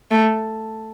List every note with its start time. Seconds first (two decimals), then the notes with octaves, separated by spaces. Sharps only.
0.11 A3